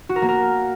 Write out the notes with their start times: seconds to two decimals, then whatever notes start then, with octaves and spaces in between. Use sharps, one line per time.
0.09 F#4
0.16 A#4
0.22 A#3
0.29 A#4